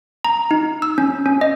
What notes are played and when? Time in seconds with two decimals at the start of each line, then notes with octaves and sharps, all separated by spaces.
0.25 A#5
0.51 D#4
0.82 E6
0.98 C#4
1.26 C#4
1.41 D#5